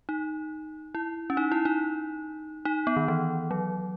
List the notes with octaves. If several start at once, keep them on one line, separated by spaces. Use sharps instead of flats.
D#4
E4
C#4
D#4
E4
D#4
D#4
B3
D#3
E3
F#3